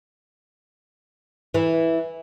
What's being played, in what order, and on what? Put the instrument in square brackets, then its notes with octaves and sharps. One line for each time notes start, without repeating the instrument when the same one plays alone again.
[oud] E3